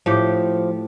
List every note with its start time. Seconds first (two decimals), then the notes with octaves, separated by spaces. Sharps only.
0.06 A2 F3 G4